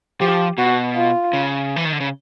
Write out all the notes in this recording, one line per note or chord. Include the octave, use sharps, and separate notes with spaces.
F3 G4
B2 F#4
F4
C#3
E3
D#3
D3
C#3